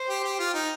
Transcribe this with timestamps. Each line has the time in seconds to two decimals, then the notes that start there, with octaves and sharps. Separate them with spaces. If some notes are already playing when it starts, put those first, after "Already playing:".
Already playing: C5
0.09 G4
0.24 G4
0.39 F4
0.54 D#4